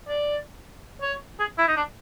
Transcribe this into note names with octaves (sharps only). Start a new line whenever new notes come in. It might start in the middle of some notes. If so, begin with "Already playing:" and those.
D5
C#5
G#4
E4
D#4
D4